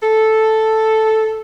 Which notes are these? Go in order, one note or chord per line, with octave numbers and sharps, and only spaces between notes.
A4